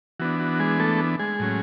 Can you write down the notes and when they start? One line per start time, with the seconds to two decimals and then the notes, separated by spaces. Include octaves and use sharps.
0.20 E3 B3 D4 F#4
0.40 F#4
0.59 G#3 G#4
0.79 A3 A4
1.19 G#3 G#4
1.39 A2 F#3 C#4